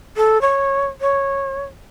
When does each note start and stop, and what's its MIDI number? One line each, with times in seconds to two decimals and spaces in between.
0.17 0.40 69
0.41 0.86 73
1.01 1.62 73